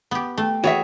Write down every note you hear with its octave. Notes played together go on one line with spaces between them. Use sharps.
B3 G4
A3 G5
E3 F#4 G#4 C#5 E5